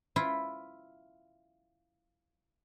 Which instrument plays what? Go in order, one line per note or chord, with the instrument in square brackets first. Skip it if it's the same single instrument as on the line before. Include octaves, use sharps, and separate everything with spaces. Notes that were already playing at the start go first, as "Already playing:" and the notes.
[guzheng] E4 F4